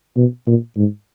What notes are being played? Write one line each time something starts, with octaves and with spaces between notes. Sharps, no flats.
B2
A#2
G#2